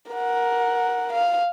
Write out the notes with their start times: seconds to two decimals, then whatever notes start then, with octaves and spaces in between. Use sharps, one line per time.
0.12 A#4 F#5
1.13 F5